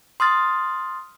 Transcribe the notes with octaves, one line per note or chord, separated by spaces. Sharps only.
C6 D#6 F6 A6